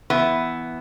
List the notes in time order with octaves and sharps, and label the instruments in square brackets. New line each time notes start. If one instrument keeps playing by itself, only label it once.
[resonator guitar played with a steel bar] E3 B3